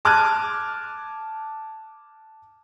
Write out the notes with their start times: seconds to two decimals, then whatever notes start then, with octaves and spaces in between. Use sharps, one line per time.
0.05 A5 D6 F6 F#6 G#6 D#7